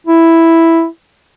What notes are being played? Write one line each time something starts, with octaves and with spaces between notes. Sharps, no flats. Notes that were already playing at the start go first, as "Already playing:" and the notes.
E4